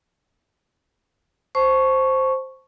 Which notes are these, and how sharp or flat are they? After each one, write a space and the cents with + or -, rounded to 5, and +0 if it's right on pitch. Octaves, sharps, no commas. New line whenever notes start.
C5 +0 A5 +0 C#6 +0